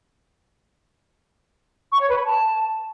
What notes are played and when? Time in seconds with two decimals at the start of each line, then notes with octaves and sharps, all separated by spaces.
1.91 C#6
2.00 C#5
2.08 B4
2.17 B5
2.25 A5